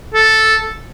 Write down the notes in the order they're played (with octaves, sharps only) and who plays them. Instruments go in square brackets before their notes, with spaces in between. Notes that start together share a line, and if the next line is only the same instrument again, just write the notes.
[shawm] A4